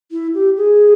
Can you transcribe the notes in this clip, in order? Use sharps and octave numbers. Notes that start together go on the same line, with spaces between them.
E4
G4
G#4